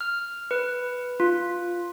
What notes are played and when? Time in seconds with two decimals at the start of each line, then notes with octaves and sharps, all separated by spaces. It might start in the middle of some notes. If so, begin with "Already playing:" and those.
0.01 F6
0.51 B4
1.20 F4